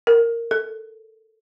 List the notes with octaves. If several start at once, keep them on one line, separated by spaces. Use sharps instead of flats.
A#4
A4